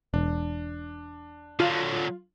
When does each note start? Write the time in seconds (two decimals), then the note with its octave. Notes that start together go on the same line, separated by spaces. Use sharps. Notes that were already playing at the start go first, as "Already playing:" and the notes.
0.14 E1 D4
1.60 D3 F#3 F4